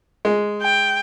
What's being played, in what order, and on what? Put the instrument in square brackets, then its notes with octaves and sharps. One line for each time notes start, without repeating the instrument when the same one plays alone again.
[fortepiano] G#3
[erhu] G5